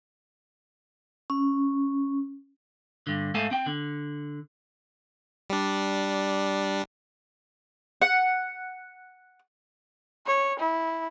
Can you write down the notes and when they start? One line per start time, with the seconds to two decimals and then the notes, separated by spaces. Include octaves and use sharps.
1.30 C#4
3.07 G2 D3
3.34 G#2 A3 A4 F5 G#5 A5
3.51 C4 G5
3.66 D3
5.50 G3 D4
8.02 F#5
10.26 C#5
10.59 E4